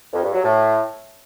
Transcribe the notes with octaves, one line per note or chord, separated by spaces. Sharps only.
F2
G2
F#3
A2